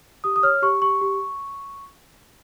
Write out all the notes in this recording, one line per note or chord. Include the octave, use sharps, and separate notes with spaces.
G4 D#6
D#6
C#5 F6
G4 C#6
G4 C#6
G4